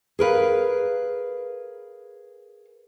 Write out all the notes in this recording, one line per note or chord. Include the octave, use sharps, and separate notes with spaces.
G#4 A#4 B4 F5